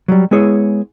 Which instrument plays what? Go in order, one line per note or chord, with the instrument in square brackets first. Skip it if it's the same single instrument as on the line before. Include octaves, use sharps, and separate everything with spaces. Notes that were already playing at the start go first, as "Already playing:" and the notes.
[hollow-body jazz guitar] F#3 G3
G#3 B3 E4 G#4 C#5